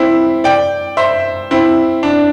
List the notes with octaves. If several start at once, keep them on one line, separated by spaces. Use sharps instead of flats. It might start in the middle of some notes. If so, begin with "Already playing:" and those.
Already playing: C4 E4
D5 G5
C5 E5
C4 E4
D4